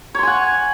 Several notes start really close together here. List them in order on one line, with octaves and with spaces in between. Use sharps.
C#5 C6 G#5 F#5